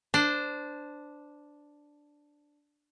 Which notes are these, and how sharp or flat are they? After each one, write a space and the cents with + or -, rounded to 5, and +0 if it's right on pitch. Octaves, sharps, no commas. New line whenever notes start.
D4 +0 C5 -15